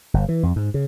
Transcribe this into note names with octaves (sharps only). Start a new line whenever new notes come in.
G1
E3
F2
G#2
C#3